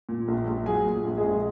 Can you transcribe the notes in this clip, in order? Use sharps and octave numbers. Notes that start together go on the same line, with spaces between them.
A#2
A#1
A#1
F#3 G#4 G#5
A#2
A#1
G#3 G#4
A#1